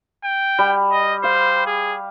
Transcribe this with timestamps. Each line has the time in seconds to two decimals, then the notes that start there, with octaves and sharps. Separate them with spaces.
0.24 G5
0.59 G3
0.92 D#5
1.24 C5 F5
1.66 G#4